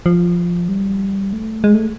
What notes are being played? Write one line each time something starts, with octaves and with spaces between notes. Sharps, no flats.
F3
G3
A3
G#3
A3